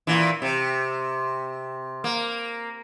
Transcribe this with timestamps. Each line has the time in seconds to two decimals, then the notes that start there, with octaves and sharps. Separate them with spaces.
0.07 A#2 E3
0.42 C3
2.04 A#3